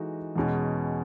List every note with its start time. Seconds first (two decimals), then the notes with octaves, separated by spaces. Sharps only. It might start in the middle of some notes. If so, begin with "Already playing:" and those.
Already playing: E3 G#3 D#4 F#4 A4
0.36 E2 B2 G#3 C#4 G#4